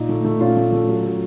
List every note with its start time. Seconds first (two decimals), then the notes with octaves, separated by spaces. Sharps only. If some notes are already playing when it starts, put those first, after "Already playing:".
Already playing: A#2 D#4
0.09 A3
0.25 A3
0.40 A#2 C#4 F4
0.57 A3
0.73 A3
0.88 F#3
1.04 F#3